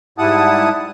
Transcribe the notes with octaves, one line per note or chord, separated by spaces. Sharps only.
G#2 G3 E4 F#5 A5 D#6